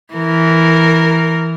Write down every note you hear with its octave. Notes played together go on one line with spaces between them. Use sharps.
E3 A#4